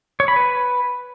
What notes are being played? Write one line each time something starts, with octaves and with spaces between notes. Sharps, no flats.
C#5
B5
B4